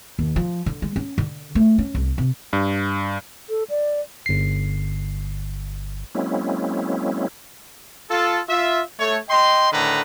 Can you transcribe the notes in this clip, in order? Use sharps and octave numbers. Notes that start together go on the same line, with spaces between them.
D#2
F3
D3
G#3
C#4
D3
A3
C#4
C2
C3
G2
A4
D5
G1 C7
F#3 G#3 A#3 C4 C#4 E4
F4 A4
F4 E5
A3 C#5
D#5 G5 C6
A2 D3 D#3 B4 A#5